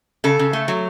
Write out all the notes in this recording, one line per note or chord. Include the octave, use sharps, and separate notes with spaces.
C#3 A4
C#3
A3
F#3